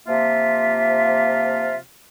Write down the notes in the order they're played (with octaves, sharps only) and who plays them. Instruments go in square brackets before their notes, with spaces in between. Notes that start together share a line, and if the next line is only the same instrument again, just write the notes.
[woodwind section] C3 F3 A#3 F4 E5